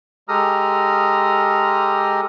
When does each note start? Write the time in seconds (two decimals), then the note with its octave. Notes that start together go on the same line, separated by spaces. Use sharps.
0.28 G#3 G4 A4 A#5 D#6 F6